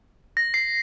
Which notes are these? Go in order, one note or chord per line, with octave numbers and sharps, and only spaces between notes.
A#6
C7